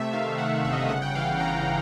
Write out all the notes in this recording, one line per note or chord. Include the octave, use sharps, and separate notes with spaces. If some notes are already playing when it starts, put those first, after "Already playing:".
Already playing: C3 A3 E5
D#3 F5
D#3 F#5
G1 E5
D#5
E5
C#3 F#5
G5
E3 F5
F5
C#3 A#5
C#3